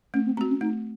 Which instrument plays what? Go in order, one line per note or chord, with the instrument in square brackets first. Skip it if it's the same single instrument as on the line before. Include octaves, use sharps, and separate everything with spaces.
[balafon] A3 [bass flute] C#4
[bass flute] C4
[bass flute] A3 [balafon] C4 F#4
[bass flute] C#4
[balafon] A3 [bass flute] D#4